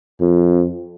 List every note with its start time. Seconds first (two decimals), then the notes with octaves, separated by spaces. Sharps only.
0.21 F2